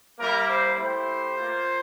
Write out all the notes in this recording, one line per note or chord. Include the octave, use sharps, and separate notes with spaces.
G3 A#3 E4 A#4
C5
A3 E4 G4 C5
A#3 F4